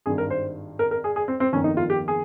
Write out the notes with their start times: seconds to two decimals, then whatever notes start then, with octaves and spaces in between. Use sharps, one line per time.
0.06 G#1 G2 D#3 G#4
0.18 A#4
0.30 C5
0.79 A#4
0.91 A#4
1.04 G#4
1.16 G#4
1.28 C4
1.40 C4
1.53 G1 F2 D#3 A#3 C#4
1.64 D#4
1.77 F4
1.90 G4
2.08 G#4